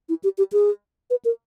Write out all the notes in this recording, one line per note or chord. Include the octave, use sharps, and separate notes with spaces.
E4
G4
G4
G#4
B4
A#4